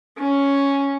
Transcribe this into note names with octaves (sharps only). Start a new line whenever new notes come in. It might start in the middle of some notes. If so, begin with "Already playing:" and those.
C#4